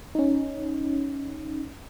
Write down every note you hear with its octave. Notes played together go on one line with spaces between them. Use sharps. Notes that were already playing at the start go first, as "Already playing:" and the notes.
C#4 D#4